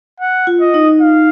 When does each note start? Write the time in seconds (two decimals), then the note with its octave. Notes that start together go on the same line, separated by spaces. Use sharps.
0.20 F#5
0.47 F4
0.61 D#5
0.74 D#4
1.01 F5